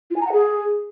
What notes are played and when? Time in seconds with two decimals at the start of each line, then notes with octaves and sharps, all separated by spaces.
0.11 F4
0.16 G#5
0.21 A#5
0.27 F#5
0.32 G#4